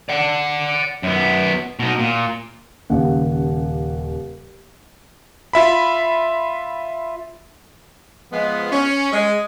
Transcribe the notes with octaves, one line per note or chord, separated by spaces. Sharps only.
D5 F#5
F#2 B3
B2 D#4
A#2
D#1 D#2 C#3 F#5
F4 E5 B5
F3 G#3 B3
C#4
G#3